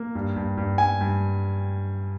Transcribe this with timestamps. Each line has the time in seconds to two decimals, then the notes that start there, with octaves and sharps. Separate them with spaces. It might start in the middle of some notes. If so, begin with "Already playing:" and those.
Already playing: A#3
0.15 G2
0.36 G2
0.57 G2
0.78 G2 G#5
1.01 G2